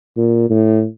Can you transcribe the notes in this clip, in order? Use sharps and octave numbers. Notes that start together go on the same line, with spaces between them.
A#2
A2